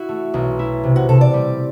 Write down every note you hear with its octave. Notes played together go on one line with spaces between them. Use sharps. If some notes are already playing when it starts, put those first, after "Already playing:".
Already playing: E4 F#4
A3
B1
E4
C3
F#4
C3 A4
D5
G3